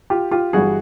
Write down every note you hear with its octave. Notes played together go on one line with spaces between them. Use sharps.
F4 G4
F4 G4
G1 G2 E3 G3 F#4 G#4